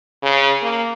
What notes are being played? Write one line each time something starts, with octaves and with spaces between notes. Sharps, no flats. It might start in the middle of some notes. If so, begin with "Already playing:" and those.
C#3
A#3